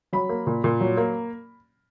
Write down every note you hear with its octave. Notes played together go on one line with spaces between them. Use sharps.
F#3 B5
A#3
A#2
A#2
F#3
A#3